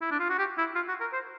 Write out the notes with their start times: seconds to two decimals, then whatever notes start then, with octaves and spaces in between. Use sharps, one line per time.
0.02 E4
0.11 D4
0.20 F4
0.29 F#4
0.38 G4
0.58 E4
0.75 F4
0.88 F#4
1.01 A#4
1.13 C5